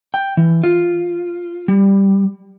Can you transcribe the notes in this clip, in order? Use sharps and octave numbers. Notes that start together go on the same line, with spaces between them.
G5
E3
F4
G3